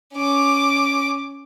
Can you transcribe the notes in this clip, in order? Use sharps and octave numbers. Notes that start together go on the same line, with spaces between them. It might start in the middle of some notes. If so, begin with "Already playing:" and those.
C#4 D6